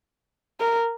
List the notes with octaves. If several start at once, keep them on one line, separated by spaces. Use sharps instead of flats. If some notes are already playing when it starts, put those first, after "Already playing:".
A#4